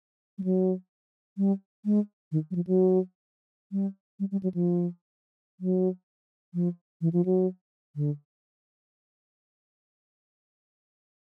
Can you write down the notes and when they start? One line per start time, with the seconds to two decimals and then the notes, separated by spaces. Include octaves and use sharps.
0.38 G3
0.44 F#3
1.37 G3
1.85 G#3
2.32 D#3
2.51 F#3
2.55 F3
2.67 F#3
3.72 G3
4.20 G3
4.32 G3
4.43 F#3
4.54 F3
5.60 F#3
6.54 F3
7.01 E3
7.13 F3
7.25 F#3
7.96 D3